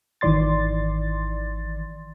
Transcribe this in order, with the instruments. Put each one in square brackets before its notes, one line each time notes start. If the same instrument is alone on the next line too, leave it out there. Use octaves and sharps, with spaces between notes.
[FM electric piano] G#1 D#3 E3 D5 C6 A6